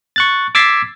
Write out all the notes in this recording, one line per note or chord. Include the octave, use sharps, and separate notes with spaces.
C#6 F#6 A6
D6 E6 G#6 A6 B6 C7